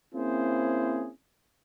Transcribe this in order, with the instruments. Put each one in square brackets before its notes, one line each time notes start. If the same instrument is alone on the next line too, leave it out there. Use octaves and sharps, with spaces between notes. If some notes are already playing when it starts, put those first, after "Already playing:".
[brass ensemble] A#3 C4 C#4 E4 G#4 C5